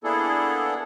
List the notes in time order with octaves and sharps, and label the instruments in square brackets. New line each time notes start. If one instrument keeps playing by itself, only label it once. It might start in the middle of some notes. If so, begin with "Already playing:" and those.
[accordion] A#3 B3 D4 E4 G#4 A4